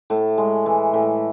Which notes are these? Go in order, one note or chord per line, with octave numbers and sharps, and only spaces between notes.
A2
G#3
E3
A2